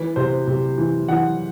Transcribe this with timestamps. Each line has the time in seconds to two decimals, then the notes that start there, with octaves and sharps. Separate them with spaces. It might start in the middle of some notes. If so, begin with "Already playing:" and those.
Already playing: E3 B4
0.16 C3 C5
0.47 C3
0.78 E3
1.08 E3 F#5